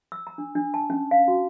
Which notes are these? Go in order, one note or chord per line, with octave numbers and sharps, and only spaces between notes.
E6
A#5
D4
D4
A5
C#4
F5
F#4